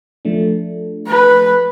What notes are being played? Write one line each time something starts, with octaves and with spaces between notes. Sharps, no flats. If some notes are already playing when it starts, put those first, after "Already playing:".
F3 A3 D4
B4